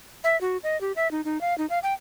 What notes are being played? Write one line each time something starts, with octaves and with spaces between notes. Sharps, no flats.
E5
F#4
D#5
G4
E5
D#4
D#4
F5
D#4
F5
G5